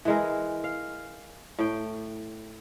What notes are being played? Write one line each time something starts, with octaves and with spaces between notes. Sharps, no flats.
E3 G#3 A#4
F5
A2 G5